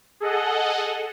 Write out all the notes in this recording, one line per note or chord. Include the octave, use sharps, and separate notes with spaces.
G#4 A4 D#5 F#5